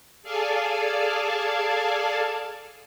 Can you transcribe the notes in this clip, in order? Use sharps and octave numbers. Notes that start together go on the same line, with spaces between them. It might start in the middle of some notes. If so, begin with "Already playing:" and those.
G#4 A4 D5 F5 G#5 A5